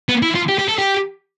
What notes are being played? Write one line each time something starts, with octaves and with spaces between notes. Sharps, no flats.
B3
E4
F4
G4
G4
A4
G4